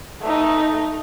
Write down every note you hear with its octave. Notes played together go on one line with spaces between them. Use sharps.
A3 D#4